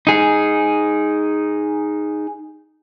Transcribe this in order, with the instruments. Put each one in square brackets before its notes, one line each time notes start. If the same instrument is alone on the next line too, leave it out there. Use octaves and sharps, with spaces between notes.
[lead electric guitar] D#4 G#4